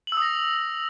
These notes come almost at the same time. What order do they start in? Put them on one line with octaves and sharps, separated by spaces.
F#7 E6 D#6 A#6